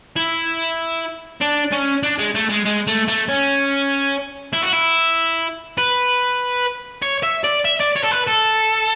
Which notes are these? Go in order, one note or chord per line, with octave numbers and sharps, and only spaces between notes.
E4
D4
C#4
D4
G#3
A3
G#3
G#3
A3
A3
C#4
E4
F#4
E4
B4
C#5
E5
D5
E5
D5
C#5
A4
B4
A4